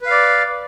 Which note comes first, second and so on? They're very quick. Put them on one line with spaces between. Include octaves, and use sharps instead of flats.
B4 F5 D5